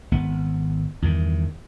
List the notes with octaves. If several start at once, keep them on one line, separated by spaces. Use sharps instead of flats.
G#1 B3
E2 G2 D#3